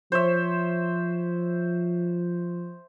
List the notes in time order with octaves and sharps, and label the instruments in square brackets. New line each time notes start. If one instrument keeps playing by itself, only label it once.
[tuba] F3 [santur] C5 C#5 E5